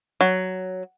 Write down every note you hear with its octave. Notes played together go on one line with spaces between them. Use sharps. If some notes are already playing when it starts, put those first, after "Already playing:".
F#3